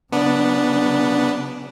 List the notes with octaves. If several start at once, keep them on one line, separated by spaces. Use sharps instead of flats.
C#3 F#3 B3 D4